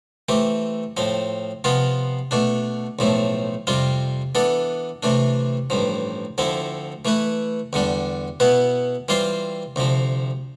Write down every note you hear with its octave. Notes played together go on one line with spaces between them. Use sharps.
E3 A3 C4 G4
A2 F3 C4
C3 F3 B3 F4
B2 A3 D4
B1 A2 F3 A3
F2 C3 G3 C4 F4
E3 B3 D4 A4
C3 E3 A3 D4
A1 G2 F3
D2 D3 F3 C4 E4
E3 A3 E4 B4
E2 D3 G3 D4
B2 B3 E4 B4
E3 G3 C4 F4 C5
D2 C3 F3